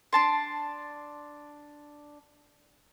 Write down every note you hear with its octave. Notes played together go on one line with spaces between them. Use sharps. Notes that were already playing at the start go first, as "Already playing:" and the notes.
D4 A5 C6